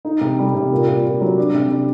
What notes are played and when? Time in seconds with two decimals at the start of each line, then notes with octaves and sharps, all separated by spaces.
0.05 D#4
0.21 C3
0.39 G3
0.55 C3
0.72 A#2
0.88 A#2
1.05 A#2
1.21 F#3
1.38 D4
1.54 C3
1.70 D4